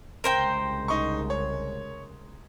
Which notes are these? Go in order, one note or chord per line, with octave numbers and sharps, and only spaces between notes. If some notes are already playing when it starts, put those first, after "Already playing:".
C2 C#3 G#3 A#4 C5 G5
D#4 C#6
C#5